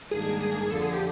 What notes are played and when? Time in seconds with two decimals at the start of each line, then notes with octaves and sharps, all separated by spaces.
0.11 G#2 D#3 G3 A#3 D4 G#4
0.41 G#4
0.70 F2 D3 F3 A4
0.82 G#4
0.93 G4